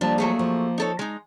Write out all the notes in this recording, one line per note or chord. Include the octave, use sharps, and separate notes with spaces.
F3 G3 A#3 D4
F#3 A3 G#4
F3
D#4 A4 C#5
G#3 D#4